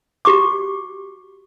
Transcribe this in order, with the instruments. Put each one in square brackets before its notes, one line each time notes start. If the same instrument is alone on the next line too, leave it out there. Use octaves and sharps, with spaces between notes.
[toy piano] F#4 G4 C#6 D6